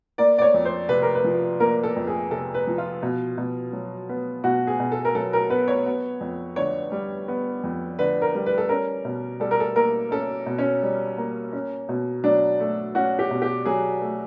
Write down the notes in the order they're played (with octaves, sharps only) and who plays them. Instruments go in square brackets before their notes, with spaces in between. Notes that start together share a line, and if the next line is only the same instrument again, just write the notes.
[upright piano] A#3 D5
D5
C#5
F2
C5
C3 B4
A#4
B4
F3
A#3 A#4
A4
F2
G#4
C3 A4
B4
F3
F4
B2
B2
F#3
B3
B2 F#4
G#4
B2
A4
A#4
F#3 A4
A#4
B3 B4
C#5
B3
F2
D3 C#5
G3
B3
F2
D3 B4
A#4
G3
B4
A4
C#4 A#4
B2
G3 A4
A#4
A4
A#3 A#4
C#4 A4
B2
C#4
G3
A#3
C#4
B2
F#3 D4
A3
C#4 F#4
G4
B2
G4
F#3 G#4
A3